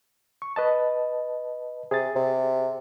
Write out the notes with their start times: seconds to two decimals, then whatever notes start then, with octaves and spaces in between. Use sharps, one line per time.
0.42 C#6
0.56 B4 D#5 A5
1.91 C3 G#4 A6
2.15 C3